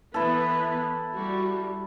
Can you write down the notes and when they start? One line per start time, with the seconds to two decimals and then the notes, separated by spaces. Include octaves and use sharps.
0.14 E3 B3 E4 A4 B4
1.13 G3 F#4